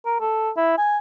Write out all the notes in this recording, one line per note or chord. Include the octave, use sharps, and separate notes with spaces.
A#4
A4
E4
G#5